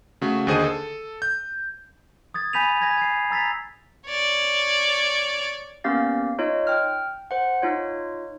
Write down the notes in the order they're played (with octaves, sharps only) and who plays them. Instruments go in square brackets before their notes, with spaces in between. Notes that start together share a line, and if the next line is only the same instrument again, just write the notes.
[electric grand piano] C#3 A3 F#4
D#2 D3 G#4 C5 D#5 D#7
A4
G6
[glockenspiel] D#6 G#6 A6
G#5 B5 G6 B6 D#7 F7
G#5 G#6 A#6
G#6 C7
A#5 E6 A6 B6 F7
[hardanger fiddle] C#5 D5
[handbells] A#3 B3 C#4 G4 F5 A6
D#4 F4 C#5 D#5
G5 F6
C5 F#5
D#4 F4 C#5